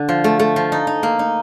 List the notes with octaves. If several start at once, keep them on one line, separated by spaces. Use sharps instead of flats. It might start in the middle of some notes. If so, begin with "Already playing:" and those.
Already playing: D3
F3
A3
A3
F3
D#4
D#4
A#3
D#4